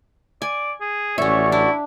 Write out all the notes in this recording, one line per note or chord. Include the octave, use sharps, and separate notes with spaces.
D5 G#5
G#4
A1 C#4 F#4 C#5 D5 E5
D4 E4